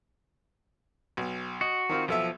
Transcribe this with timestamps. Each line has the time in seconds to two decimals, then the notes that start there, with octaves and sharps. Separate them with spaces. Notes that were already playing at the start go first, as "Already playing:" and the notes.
1.17 B1
1.61 F#4 D#5
1.89 D#3 C4 F4
2.08 B1 F3 A4 E5